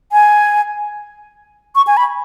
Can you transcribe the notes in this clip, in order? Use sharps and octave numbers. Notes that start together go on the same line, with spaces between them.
G#5
C#6
G#5
B5